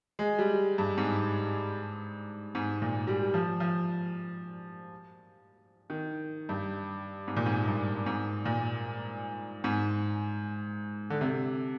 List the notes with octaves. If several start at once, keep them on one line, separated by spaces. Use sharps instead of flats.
G#3
G3
G2
G#2
G#2
A#2
G3
F3
F3
D#3
G2
G#2
A#2
G#2
G2
G#2
A#2
G#2
D3
C3